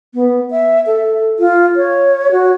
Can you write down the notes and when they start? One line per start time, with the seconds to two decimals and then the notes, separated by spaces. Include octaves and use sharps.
0.14 B3
0.51 E5
0.87 A4
1.39 F4
1.76 C#5
2.32 F#4